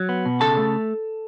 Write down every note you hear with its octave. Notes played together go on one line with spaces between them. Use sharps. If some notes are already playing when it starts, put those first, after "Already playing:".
Already playing: F#3
B3
B2
C#3 A4 A5
A3